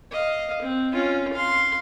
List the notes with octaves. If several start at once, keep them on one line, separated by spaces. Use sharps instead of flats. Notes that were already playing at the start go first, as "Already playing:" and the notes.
D#5 F5
C4
C#4 F4
F5 C6